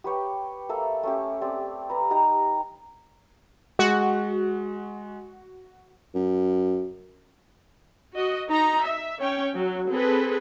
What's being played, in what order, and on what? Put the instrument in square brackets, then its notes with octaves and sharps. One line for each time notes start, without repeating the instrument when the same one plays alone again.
[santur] G4 B4 C#5 G5
A#3 A4 E5
A3 C#4 G4
C4 G4 D5
B4 A#5
D#4 G4 G5 A#5
[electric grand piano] G#3 [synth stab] F#4
[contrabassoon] F#2
[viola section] F#4 D#5
D#4 A#5
E5
C#4 C#5 G5
F#3
C4 G#4 A4 B4